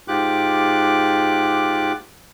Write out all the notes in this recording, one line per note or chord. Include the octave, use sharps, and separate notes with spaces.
G#2 F4 G4 D6 F#6